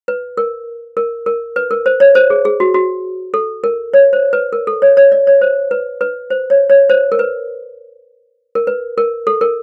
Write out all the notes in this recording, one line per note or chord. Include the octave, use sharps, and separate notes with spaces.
B4
A#4
A#4
A#4
B4
A#4
C5
C#5
C5
G#4
G#4
F#4
F#4
A4
A#4
C#5
C5
B4
A#4
A4
C#5
C#5
D5
C#5
C5
B4
B4
C5
C#5
C#5
C5
A#4
B4
A#4
B4
A#4
A4
A#4